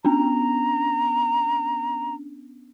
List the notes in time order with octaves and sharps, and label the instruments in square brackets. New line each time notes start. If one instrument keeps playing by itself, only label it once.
[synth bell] B3 C#4 D4 [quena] A#5